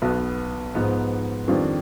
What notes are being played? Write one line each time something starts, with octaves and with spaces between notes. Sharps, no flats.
B1 B2 B3
G#2 F3 B3 D#4
F2 D#3 G3 D4 F4